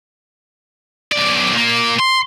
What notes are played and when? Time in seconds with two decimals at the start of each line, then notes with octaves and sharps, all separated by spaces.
1.12 B1 D5
1.54 A#2 A#3
2.00 C6